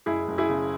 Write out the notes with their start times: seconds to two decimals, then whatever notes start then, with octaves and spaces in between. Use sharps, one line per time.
0.06 F#1 E4 G#4
0.27 F#1
0.38 E4 G#4
0.49 C#3